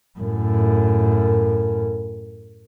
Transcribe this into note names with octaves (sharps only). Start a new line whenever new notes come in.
F#2 A2